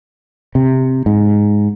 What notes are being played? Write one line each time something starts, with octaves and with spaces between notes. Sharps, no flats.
C3
G#2